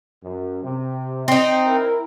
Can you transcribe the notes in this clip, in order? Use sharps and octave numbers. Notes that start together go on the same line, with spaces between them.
F#2
C3
C4 D#4 D#5
E4 A#4